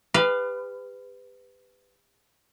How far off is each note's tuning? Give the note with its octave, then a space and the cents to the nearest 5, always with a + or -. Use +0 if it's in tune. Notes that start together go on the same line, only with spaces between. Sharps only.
G4 +35 B4 +20 F5 -5